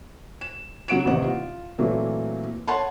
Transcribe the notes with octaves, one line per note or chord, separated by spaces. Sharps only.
E7
C#3 F#3 F#5 D7 E7
A1 D#2 C3 C5 F#5
F4
A#2 E3 F#3 A3 A#3 C4
C#5 F#5 A5 C6